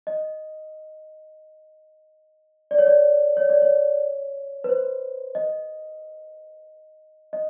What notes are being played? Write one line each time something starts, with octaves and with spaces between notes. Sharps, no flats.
D#5
D5
C#5
D5
C#5
D5
C#5
B4
C5
D#5
D#5